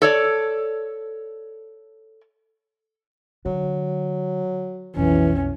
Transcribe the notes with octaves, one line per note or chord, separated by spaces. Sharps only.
A4 C#5 D5
D3 F#3
B1 F2 E3 C#4